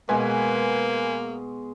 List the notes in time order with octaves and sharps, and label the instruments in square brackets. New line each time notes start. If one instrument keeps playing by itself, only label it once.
[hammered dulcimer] B2 G#3 [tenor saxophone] A#3 [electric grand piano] B4 G#5